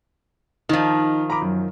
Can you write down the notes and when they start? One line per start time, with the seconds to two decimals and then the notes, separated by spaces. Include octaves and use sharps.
0.69 D#3 F3 D#4
1.30 A#5 B5 D6
1.42 F#2